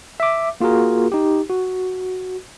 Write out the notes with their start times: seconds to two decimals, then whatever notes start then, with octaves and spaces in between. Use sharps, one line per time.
0.20 E5 D6
0.60 A#3 F4 F#4 G#4 A#4
1.12 D#4 G4
1.50 F#4